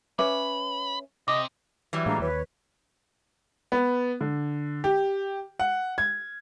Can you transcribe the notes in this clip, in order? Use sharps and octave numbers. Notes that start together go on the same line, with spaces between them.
C#4 B4 E5 B5 D6
C3 D#5 D6
E3 F#3 G3
A2 G#3 D4 F5 A#5
D#2 B4 C#5
B3
D3
G4
F#5
G#6